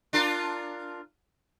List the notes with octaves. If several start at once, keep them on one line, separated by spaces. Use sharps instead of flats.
D4 F4 A#4